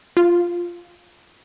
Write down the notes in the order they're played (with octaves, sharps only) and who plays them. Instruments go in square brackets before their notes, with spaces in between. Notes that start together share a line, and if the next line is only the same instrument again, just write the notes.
[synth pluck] F4